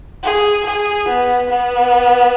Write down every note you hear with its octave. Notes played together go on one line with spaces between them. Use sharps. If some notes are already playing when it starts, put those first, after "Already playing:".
G#4
G#4
B3
B3